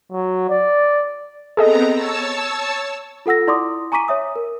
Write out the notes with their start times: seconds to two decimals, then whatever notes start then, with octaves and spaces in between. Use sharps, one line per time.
0.12 F#3
0.49 D5
1.57 B3 C4 G#4 A4 D#5 A#5
1.92 C#5 A5 E6
3.26 F4 A4 F#5 E6 A#6
3.47 E4 D5 C6 D6 D#6
3.92 G#5 A#5 C#6 D6 B6 D#7
4.08 C#5 E5 D#6
4.36 A#4